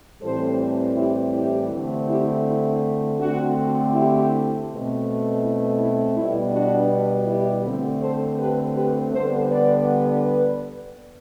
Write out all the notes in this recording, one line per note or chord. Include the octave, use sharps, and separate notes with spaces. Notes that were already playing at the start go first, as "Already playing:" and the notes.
A2 E3 G3 C4 A4 C5
E4 G4
E4 G4
D3 A3 C4
E4 G4
E4
D3 A3 C4 D4 F#4
E4 G4
B2 A3 C4
E4
E4
B2 G3 B3 E4
D4 F#4
E4 G4
D3 A3 C4
A4 C5
G4 B4
G4 B4
D3 G3 B3 A4 C5
B4 D5
B4 D5